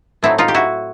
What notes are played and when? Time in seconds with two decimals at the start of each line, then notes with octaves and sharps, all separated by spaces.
0.23 A2 F#3 A3 C4 D#4 E4
0.38 D#4 F4
0.48 G4
0.54 E4 F#4